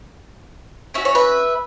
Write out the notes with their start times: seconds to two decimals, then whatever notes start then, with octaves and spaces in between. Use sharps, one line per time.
0.94 C#4 F#4 E5
1.05 C#5
1.15 B4 E5